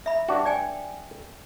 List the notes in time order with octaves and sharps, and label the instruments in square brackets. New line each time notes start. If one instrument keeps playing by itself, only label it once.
[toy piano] E5 B5
[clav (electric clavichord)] G2 D4 F#4
[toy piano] D5 G5 G#5